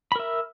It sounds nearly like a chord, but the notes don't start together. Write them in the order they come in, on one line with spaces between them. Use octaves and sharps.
B5 A#4 E5